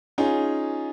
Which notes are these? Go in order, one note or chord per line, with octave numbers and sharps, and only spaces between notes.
C#4 D#4 F4 G#4